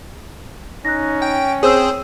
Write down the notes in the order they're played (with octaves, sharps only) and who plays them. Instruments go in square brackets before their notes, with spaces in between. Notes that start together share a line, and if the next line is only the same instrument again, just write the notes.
[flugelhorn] C#4 [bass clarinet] D#4 [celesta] F#6 A#6
[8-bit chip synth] G5
[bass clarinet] C4 [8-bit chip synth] G#4 C5 [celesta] C#5 E6